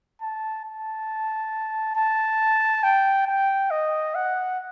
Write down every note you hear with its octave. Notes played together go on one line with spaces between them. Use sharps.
A5
A5
A5
G5
G5
D#5
F#5